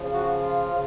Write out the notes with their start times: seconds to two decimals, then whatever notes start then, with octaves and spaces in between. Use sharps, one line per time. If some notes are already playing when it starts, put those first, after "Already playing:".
Already playing: C#3 F3
0.13 F#4
0.42 F4
0.70 C#3